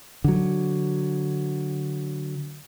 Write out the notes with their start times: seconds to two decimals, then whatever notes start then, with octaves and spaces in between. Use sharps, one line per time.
0.24 D3 F#3